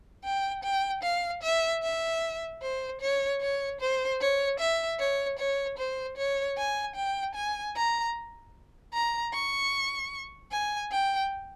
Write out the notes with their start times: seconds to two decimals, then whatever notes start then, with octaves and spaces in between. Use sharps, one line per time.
0.24 G5
0.63 G5
1.03 F5
1.42 E5
1.83 E5
2.62 C5
3.01 C#5
3.41 C#5
3.80 C5
4.20 C#5
4.59 E5
4.99 C#5
5.39 C#5
5.78 C5
6.17 C#5
6.57 G#5
6.96 G5
7.35 G#5
7.76 A#5
8.93 A#5
9.33 C#6
10.51 G#5
10.91 G5